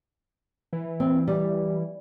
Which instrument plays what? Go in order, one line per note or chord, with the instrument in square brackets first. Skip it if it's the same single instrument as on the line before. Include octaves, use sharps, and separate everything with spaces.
[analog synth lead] E3
[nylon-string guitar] C4
G3